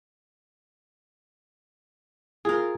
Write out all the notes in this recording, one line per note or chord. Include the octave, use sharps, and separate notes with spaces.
F4 G#4 A#4